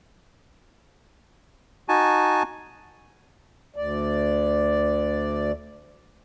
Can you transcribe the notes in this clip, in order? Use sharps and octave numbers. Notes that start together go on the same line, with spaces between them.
D#4 F#4 G#5 A5
D2 D5